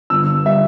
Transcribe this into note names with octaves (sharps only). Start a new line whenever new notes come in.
G1 E6
G3 E5